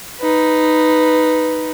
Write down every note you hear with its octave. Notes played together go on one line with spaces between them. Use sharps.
D#4 B4